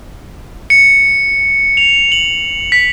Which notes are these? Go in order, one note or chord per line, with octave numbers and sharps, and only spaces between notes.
C#7
F7
F#7
B6